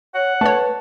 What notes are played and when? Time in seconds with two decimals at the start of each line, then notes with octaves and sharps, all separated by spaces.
0.15 C#5 F#5
0.41 A3 B4 C#5 A5